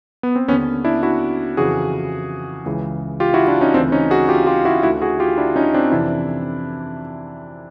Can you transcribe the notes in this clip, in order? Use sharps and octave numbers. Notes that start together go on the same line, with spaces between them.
B3
C4
D#2 D3 B3 C#4
D4 E4
E4 F#4
F2 C#3 E3 F#4 G#4
C#2 C#3 E3
F4 G4
E4 F#4
D4 E4
C#4 D#4
D2 C#3 E3 C4 D4
C#4 D#4
F#4 G#4
F4 G4
F4 G4
E4 F#4
D2 D3 E4 F#4
F#4 G#4
F4 G4
D4 E4
C#4 D#4
C4 D4
F2 C3 E3 D4 E4